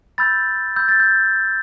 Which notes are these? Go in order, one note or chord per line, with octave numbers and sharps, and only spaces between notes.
B5 E6 G6 A6
B5 E6 G6
A6
G6